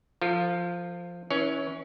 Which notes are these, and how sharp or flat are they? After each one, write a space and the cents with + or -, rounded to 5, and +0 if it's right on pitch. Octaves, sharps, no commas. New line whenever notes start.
F3 +0 F4 +0 A4 +45
E3 -30 C#4 +0 C#5 +20